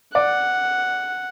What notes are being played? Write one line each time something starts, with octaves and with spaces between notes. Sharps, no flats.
D5 F#5